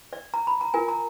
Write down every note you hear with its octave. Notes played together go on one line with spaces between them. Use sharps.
D5
A#5
B5
A#5
F4 A#4 G#5
A#5